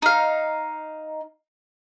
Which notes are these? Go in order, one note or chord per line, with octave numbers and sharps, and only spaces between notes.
D#4 F5